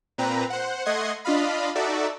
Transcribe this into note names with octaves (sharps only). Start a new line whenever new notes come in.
A#2 C4 B4 A#5
C5 F#5
A3 D#5 F#5 C6 G#6
D4 F4 D#5 F5 B5
D#4 F#4 A4 D5 E5